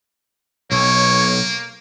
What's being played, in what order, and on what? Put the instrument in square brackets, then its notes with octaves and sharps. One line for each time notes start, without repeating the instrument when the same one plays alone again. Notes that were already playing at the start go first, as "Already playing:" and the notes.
[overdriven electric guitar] B1 [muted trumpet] A#3 [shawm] C#5